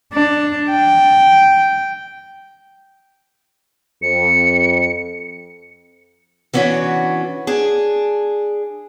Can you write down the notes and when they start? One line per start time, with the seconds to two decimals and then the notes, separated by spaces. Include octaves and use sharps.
0.13 D4
0.70 G5
4.02 F2 C#7
6.54 E3 B3 C#4 D4 F#4
7.47 D4 G#4